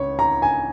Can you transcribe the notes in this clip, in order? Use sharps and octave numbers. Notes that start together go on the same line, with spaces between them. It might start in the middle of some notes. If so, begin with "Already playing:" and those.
Already playing: C#2 C#5
A#5
G#5